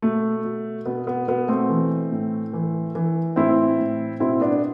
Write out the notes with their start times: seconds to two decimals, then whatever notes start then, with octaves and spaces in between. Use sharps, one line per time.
0.02 B2 A3
0.44 B2
0.86 B2 B3
1.07 B3
1.28 B2 B3
1.48 A3 C4
1.69 E3
2.12 A2
2.54 E3
2.95 E3
3.36 A2 C4 E4
3.79 A2
4.20 B2 C4 E4
4.41 B3 D4